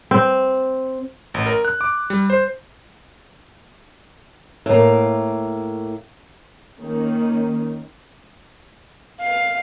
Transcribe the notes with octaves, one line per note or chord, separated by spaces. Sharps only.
C4
A1
A#4
F#6
D6
G3
C5
A2 A#3
D#3 A#3 C#4
F5